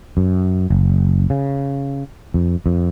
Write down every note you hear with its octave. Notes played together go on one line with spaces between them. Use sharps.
F#2
F#1
C#3
F2
F2